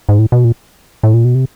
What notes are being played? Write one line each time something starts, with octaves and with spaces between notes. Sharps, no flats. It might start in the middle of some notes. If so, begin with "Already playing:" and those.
G#2
A2
B2
A#2
A2
A#2
B2
C3